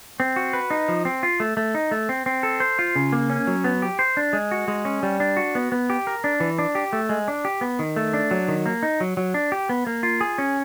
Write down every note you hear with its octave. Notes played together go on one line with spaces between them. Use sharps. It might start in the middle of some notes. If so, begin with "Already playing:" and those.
C4
F#4
B4
D#4
F3
C4
F4
A3
A3
D#4
A3
C4
C4
A4
C5
F4
C#3
A#3
C#4
F#3
B3
G4
C5
D4
G#3
F#4
G#3
C#4
G3
D4
F#4
B3
B3
G4
A#4
D4
E3
D4
G4
A3
G#3
D4
G4
B3
D#3
A3
D4
F#3
D#3
A#3
D#4
F#3
F#3
D4
G4
B3
A#3
F4
G#4
C#4